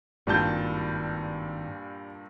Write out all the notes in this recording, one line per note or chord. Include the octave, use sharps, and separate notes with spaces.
G#1 G2 A#2 G3 A5 G6